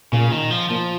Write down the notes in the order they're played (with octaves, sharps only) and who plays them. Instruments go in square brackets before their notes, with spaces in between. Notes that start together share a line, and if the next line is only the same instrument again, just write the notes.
[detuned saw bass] A#2 [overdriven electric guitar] C#3
[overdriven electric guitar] D#3
F3
[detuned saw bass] A#2 [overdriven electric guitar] F3